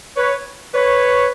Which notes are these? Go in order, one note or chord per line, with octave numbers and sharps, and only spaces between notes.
B4 C#5
B4 C#5